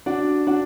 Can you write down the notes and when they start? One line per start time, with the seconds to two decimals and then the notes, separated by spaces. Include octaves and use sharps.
0.06 D4 F#4
0.47 D4 F#4